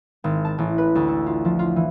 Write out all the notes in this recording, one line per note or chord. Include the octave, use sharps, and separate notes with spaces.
G#1
A5
A1
B4
D2
A4
F4
F3
F4
E3